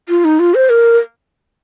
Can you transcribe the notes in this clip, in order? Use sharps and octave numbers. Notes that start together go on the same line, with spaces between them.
F4
D#4
F4
C5
A#4